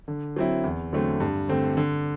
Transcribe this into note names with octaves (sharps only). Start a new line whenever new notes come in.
D3
F#3 C4 E4
E2
D3 F#3 A3 C4
G2
D3 A3 C4
D3